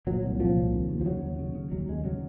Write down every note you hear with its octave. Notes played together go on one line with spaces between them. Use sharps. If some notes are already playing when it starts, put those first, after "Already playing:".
A#2 F#3
C2
A#2 F3
C2
D#2
D#2
F3
C#3 F#3
D#2
C#3
C#3
D#2 F#3
D#2 G#3
C#3 F#3